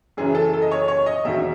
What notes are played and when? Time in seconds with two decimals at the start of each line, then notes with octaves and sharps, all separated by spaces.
0.17 F#1 F#2 E3 G#4
0.35 A4
0.53 A4
0.62 D#5
0.71 C#5
0.88 C#5
1.06 D#5
1.24 E1 D#2 D#3 F#3 E5